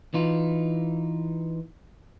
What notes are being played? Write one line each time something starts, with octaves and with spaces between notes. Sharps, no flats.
E3 D#4 F4